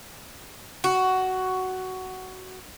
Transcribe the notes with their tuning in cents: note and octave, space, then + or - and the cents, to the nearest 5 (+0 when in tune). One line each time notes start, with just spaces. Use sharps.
F#4 +10